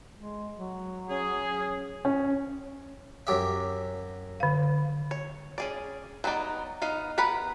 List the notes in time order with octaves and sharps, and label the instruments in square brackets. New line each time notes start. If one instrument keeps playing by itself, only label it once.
[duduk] G#3
F#3
[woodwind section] C#4 G#4
[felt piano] C#4
[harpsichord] F#2 G4 E5
[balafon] D3 F5
[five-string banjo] C#5
C#4 G#4 D5
F#3 A3 B3 D#4 D5
B3 D#4 F5
B3 A#4 B4 F#5 B5